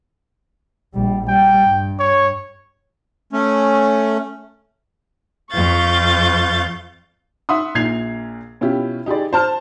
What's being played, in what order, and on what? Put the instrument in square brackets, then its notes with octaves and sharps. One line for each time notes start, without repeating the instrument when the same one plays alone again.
[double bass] A#1 G3
[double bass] G3 [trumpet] G5
[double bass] G2
[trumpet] C#5
[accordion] A3 C#4
[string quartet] F2 F5 C#6 G6 A6
[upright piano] E5 F#5 C6 D#6
A#1 A#2 G#6 C7 F7
B2 C#4 E4 F4 G4
D#4 G4 G#4 D5
C5 A5 F6